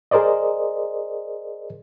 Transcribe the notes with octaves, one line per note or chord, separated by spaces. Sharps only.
G#4 A#4 C5 D5 D#5